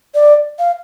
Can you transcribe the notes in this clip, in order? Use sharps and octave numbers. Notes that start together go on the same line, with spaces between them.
D5
F5